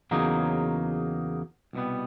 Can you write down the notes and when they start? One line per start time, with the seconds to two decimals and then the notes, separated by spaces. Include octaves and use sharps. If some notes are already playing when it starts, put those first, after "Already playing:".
0.11 E2 C#3 F#3 A#3 D#4
1.73 C2 B2 G3 B3